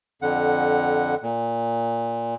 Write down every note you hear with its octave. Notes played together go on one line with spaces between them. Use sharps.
F2 D3 F#5
A#2